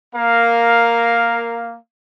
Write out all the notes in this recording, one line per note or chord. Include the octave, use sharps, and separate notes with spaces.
A#3 A#4 F5